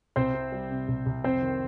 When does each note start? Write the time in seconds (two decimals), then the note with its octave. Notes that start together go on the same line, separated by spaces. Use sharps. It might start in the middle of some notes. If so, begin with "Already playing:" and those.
0.16 C2 C4 C5
0.34 C3
0.52 G3
0.70 C3
0.88 C2
1.06 C2
1.24 F2 C4 C5
1.42 D#3